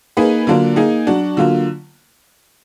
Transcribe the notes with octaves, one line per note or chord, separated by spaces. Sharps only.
A#3 D#4 G#4 B4
D3 F#3 A#3 D4 F4
A#3 D#4 G#4
F#3 D4 F#4
D3 F#3 A#3 F4